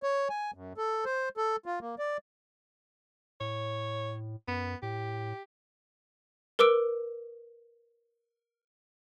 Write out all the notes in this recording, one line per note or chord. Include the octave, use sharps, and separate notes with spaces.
C#5
G#5
F#2
A4
C5
A4
F4
A#3
D5
A2 C#5
F#2 B3
A2 G4
A#4 B4 D6 E6 D7